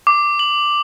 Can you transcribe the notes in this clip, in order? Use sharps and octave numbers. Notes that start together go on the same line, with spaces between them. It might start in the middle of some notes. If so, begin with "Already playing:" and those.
D6
F#7